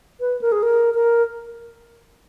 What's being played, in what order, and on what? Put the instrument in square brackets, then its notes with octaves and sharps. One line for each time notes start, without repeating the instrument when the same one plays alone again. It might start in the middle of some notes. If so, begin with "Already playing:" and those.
[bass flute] B4
A#4
G#4
A#4
A#4